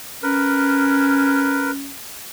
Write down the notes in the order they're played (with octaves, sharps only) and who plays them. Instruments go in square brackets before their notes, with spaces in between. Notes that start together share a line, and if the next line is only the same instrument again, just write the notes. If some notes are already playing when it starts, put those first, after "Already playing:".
[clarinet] C#4 [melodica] A#4 B4